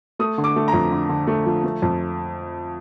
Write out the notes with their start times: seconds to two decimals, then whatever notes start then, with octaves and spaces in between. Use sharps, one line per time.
0.19 A3 D#6
0.38 D3
0.44 D6
0.56 A3
0.68 A#5
0.73 F2
0.92 D3
1.09 D3
1.27 A3
1.46 F3
1.64 A3
1.82 F2